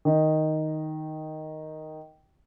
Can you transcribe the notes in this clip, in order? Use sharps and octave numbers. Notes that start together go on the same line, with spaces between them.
D#3 D#4